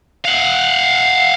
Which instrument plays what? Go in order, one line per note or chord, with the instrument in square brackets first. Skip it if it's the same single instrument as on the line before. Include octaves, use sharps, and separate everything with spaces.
[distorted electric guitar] F5 F#5